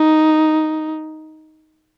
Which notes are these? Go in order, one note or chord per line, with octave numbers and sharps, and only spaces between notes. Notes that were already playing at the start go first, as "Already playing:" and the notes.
Already playing: D#4